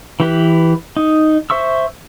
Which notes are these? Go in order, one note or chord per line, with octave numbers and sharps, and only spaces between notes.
E3 G4 B4
D#4
C5 E5 C#6 E6